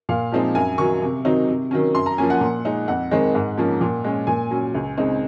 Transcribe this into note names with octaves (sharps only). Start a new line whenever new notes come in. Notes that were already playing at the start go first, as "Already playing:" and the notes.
A#2 F5
F3 G#3 C4 D#4
F#2 G#5
D#3 F#3 C#6
C3
D#3 F#3 C4 D#4
C3
D#3 F#3 C#4
F#2 C6
A#5
F3 A#3 C#4 G#5
F#5
A#2
G#3 D#4
F2 F#5
D#3 G#3 C4 D#4
G#2
F3 A#3 C#4
A#2
G#3 C#4
A#2 G#5
F#3 C#4
C#2
C#3 G#3 C4 D#4